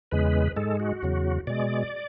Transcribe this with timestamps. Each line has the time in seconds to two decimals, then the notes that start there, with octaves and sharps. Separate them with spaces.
0.11 E2 C#3 G#3 B4
0.56 G#2 G#3 A4
0.80 F#4
1.03 E2 C#3 F#3
1.47 B2 G#3 D5